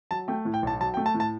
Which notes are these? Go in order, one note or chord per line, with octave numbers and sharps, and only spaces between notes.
F#3 A5
A3 G5
A2
G5
B1 A5
F#3 A5
G5
A3
A5
A2
A5